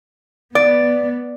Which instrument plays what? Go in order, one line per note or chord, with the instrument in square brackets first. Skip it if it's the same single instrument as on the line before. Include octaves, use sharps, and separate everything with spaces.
[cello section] B3 [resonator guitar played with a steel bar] D5